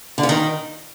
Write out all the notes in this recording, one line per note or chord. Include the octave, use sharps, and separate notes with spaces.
D3
C#3
D#3